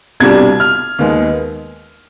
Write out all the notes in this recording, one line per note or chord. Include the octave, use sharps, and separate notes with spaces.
C2 B2 G3 D4 G#6
F6
D#2 D#3 G#3 B3